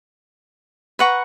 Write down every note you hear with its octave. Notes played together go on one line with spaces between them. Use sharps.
B4 F#5 A#5 C#6